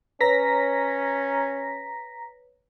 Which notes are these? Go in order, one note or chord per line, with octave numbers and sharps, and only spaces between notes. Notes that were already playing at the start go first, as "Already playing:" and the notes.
C#4 B4 C#5 A#5 A#6 B6